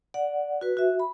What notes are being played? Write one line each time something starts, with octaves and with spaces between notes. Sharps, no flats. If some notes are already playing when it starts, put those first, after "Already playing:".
D5 F#5
F#4 B4
F#4 E5
B5